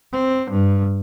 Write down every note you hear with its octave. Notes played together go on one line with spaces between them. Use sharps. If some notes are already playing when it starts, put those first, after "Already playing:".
C4
G2